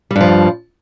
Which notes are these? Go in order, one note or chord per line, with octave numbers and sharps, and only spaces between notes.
G2 F3 G3